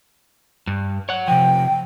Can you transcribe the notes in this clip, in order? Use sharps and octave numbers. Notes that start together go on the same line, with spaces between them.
G2
C#5 F#5
C3 F3 G5